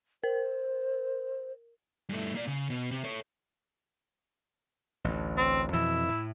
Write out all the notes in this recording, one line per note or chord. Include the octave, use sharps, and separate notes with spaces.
A#4 C5
G2 A3
A#3 D5
C#3
B2
C3
A4 C#5
A1 D2
C4
F2 B2 E3 E4
A2